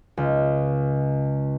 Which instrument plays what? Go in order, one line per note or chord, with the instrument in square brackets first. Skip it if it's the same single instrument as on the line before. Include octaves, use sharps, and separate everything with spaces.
[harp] C#2